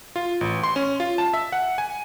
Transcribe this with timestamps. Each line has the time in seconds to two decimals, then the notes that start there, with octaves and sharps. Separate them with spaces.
0.16 F4
0.41 A1
0.63 C6
0.76 C#4
1.00 F4
1.18 A5
1.33 E5
1.52 F#5
1.78 G#5